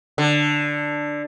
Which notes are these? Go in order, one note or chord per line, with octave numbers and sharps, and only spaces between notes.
D3